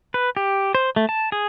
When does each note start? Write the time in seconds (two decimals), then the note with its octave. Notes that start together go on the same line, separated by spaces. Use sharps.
0.14 B4
0.37 G4
0.75 C5
0.96 A3
1.09 A5
1.32 G#4